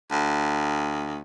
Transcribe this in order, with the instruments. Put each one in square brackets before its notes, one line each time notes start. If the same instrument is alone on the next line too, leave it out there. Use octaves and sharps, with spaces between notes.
[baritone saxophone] D2